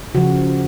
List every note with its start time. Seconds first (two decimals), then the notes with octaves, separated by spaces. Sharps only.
0.15 C#3 F3 F#4